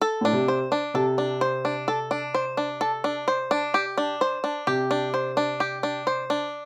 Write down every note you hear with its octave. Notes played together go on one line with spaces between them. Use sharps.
A4
A2 D4
C3
C5
D4
C3 A4
D4
C5
D4
A4
D4
C5
D4
A4
D4
C5
D4
G4
D4
C5
D4
C3 G4
D4
C5
D4
G4
D4
C5
D4